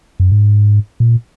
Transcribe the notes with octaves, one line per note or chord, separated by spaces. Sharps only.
F#2
G#2
A#2